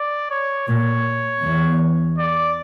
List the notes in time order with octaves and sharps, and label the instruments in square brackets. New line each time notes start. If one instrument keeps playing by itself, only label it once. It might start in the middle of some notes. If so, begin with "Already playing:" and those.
Already playing: [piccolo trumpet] D5
C#5
[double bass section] A#2 [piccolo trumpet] C#5
[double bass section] E2
[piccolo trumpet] D5